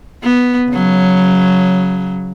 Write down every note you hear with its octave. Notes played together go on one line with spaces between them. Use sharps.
B3
C#3 F#3